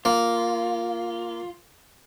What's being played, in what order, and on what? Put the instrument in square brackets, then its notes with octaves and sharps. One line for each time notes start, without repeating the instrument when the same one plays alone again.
[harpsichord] A#3 [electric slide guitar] F4